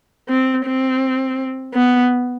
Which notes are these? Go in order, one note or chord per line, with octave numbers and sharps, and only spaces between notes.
C4
C4
B3